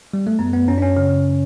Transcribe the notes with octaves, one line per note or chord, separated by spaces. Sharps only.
G3
A3
F#2 B3
B3
F#2 C#4
D4
C#4
C#3